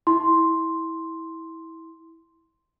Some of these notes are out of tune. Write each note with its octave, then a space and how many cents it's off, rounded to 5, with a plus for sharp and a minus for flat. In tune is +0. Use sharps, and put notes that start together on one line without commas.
E4 -20 C6 +0